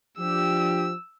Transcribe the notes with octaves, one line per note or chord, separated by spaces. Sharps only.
F3 D4 G4 E6